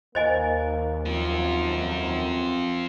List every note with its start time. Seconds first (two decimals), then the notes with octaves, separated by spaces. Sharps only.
0.15 D#2 A#3 C5 D#5 G#5
1.06 F#2 C4 F4